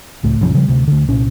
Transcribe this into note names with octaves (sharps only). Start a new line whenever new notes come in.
C#2 A2
A#1 F#2 C#3 F3
C#3 F3 G3
D2 C3
D2 D3
C2 A#2 C#4